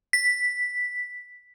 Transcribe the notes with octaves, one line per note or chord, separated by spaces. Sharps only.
B6